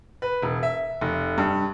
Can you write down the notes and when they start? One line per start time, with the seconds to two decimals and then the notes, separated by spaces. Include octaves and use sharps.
0.22 B4
0.42 E1
0.63 E5
1.01 F1
1.38 G2